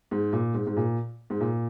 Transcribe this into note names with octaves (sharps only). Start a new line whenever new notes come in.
G#2
A#2
G#2
G#2
A#2
G#2
A#2